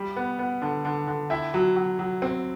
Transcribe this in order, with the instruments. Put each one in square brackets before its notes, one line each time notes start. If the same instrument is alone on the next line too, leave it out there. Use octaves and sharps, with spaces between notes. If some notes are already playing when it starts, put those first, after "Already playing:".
Already playing: [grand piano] G3
B3
B3
D3
D3
D3
E4 E5 G5
F#3
F#3
F#3
C4